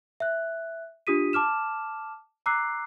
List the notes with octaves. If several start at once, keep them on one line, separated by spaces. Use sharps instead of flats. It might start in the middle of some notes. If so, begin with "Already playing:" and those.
E5 F#6
D4 F4 G4 D#6 B6 D#7
A5 D6 F6 E7
A#5 D6 E6 F#6 C7